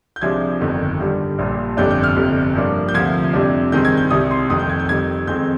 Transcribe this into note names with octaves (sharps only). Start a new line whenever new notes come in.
G6
C2 C3 F3 G#3 D4 G#6
G1 F2 D#3
G2 D3 G3
A#1 A#2 G3
G1 F2 C3 G3 D4 G6
G6
F6
G1 F2 C3
G2 F3 A#3 D4
G6
D2 C3 F3 G#6
F2 C3 G3 D4
G2 D#3 G#3 C4 G6
G#6
G6
C2 C3 G3 D#6
C6
F1 F2 D#3 D#6
G6
G#6
G6
F2 D#3 G3 G#6
F2 D#3 G#3 C4 G6